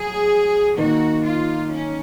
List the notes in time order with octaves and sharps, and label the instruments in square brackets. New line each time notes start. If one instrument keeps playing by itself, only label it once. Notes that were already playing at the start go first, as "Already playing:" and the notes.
Already playing: [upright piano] F#3 [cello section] G#4
[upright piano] D#3 A#3 D#4 [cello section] F#4
[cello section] F4
C#4